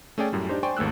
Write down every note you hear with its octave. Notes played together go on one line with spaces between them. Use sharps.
A3 C#4 G#4 D5 G5
F#2 A2 G3
D4 D#4 G4 C5
C5 D5 G5 G#5 C6 C#6
G#1 D#2 A3 E6 F#6